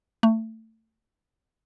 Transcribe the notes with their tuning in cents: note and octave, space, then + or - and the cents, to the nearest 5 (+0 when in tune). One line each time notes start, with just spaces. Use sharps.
A3 +20